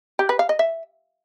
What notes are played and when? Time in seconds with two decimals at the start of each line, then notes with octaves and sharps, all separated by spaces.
0.19 G4
0.29 B4
0.39 F5
0.49 D#5
0.59 E5